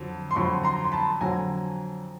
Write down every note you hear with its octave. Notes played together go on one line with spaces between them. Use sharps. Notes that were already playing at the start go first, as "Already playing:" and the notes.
Already playing: F2 D3 F#3
C6
F2 D3 F#3 B5 C#6
A#5 C6
C6
A5 B5
F2 D3 F#3 G#5 A#5